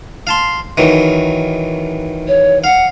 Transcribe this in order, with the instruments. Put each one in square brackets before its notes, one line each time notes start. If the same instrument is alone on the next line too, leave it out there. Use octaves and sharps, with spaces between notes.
[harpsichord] F5 A5 C6
D#3 E3 F#3
[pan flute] C#5
[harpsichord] F5 [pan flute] F#5